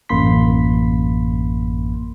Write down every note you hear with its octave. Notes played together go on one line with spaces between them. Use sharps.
A1 F#2 A#3 B5 C6 B6